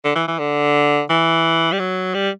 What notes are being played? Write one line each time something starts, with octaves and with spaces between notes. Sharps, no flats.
D3
E3
E3
D3
E3
G3
F#3
G3